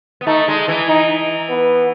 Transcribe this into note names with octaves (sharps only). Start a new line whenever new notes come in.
B3
A3 D#4
G#3
E3
D#4
B3